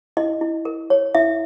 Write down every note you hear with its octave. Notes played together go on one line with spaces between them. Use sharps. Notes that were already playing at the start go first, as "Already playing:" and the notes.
E4 D#5
E4
A#4
C#5
E4 E5